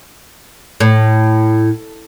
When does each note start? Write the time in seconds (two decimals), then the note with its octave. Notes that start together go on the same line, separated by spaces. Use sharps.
0.80 A2